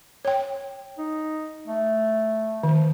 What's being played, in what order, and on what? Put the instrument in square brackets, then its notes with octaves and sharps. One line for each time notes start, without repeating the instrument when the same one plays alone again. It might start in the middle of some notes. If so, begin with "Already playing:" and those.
[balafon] C#5 G5
[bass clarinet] D#4
A3
[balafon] D#3 [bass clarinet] F3